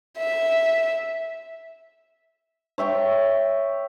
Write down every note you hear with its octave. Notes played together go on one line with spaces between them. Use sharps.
E5
C#5 E5 G5 C#6